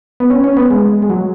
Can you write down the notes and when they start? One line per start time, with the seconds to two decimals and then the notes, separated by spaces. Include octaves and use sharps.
0.20 B3
0.30 C#4
0.44 C#4
0.57 B3
0.71 G#3
1.02 G#3
1.10 F#3